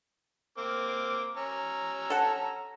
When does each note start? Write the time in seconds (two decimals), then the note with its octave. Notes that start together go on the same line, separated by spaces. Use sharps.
0.58 A#3 C4 D6
1.37 C#4 A#5 E6
2.10 A4 F#5